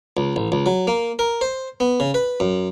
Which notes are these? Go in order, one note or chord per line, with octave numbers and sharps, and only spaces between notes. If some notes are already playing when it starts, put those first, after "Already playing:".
C#2
A1
C#2
F#3
A#3
A#4
C5
B3
C#3
B4
F#2